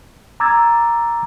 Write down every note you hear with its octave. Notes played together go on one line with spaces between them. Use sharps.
A#5 D6 E6 G#6 A6